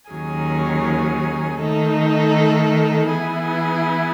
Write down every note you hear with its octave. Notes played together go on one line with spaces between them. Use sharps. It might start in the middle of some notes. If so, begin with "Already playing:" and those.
D#2 D#3 F#3 C#4 G#4
D#3 A3 D#4 A4
E3 B3 E4 G#4